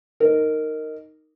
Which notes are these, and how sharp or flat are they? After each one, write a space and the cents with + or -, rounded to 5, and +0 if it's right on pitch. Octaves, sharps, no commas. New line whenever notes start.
D#4 +0 A#4 -15